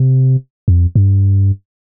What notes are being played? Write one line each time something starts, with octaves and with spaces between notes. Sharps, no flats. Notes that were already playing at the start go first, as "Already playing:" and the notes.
Already playing: C3
F2
G2